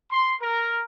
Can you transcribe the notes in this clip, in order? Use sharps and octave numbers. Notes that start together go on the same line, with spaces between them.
C6
A#4